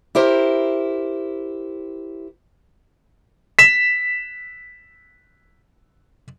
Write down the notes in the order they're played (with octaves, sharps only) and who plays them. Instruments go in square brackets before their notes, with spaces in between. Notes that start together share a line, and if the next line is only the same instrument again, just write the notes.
[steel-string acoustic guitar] E4 G4 A#4 C5
[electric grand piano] B6 E7